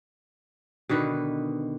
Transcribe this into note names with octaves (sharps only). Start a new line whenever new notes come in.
B2 D3 D#3 B4